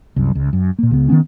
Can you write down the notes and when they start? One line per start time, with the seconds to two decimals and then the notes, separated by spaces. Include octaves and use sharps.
0.16 C2 F#2
0.35 C#2
0.53 F#2
0.79 A#2 A#3
0.91 C#2 C#3 B3
1.08 D#3 F#3 B3 C#4